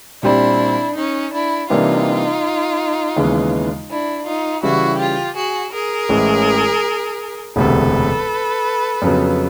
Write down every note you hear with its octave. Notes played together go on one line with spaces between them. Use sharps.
A#2 G3 C4 D4 E4
C#4 D#4
D4 E4
C3 E3 G3 A#3 D4 D#4 F4
D#2 C#3 E3 G#3 B3
D4 E4
D#4 F4
C#3 E3 G3 E4 F#4
F4 G4
F#4 G#4
G#4 A#4
A1 A2 E3 G#3 C#4
E1 D2 C3 A4 B4
F2 C#3 F#3 B3